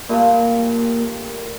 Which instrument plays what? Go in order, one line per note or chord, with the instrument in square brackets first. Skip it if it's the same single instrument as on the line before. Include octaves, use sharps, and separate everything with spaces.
[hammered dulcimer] A#2 G3 A3 [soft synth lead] A#3